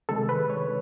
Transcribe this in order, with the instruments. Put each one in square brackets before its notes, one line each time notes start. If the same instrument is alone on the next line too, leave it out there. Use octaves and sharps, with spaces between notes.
[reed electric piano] C3 D#3 G#3 A4
B4
C#5